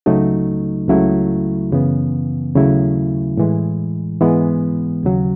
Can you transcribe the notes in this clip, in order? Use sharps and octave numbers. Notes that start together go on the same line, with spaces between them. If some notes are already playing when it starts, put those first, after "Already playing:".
C#2 C#3 F#3 A3 D#4
C#2 C#3 F#3 A3 E4
F#2 C#3 E3 B3
D#2 C#3 F#3 A3 E4
A2 E3 G#3
G#2 E3 G#3 B3
D#2 C#3 F#3